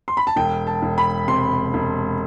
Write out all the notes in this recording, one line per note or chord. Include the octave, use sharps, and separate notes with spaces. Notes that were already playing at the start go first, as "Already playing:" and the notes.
C6
B5
A5
E1 G5
A5
E1
B5
C3 C6
E1